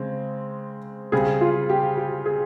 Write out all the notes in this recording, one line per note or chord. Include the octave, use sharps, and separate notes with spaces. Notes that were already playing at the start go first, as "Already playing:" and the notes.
Already playing: C#3 G#3 C4
C#3 G3 C4 G#4
F4
G4
G4
G#4